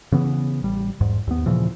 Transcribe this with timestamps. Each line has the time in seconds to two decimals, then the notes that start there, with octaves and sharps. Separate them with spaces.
0.12 C#3 E3 B3
0.63 A1 G3
1.01 E2 G#2
1.27 D#2 B3
1.46 A#2 C#3 E3 F3